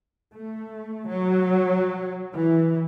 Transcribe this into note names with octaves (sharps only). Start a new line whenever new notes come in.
A3
F#3
E3